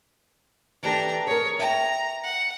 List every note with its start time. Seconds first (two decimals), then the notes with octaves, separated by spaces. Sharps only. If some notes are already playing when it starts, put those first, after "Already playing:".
0.83 E3 D4 G4 A4 A#5
1.27 G#4 A#4 C#5
1.59 E5 G5 A#5
2.23 F#5